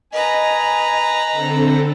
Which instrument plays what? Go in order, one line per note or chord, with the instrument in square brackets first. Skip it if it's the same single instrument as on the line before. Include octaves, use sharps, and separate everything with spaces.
[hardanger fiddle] B4 A#5 [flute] D#5 [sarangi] G#5
[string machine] D3 C4 A4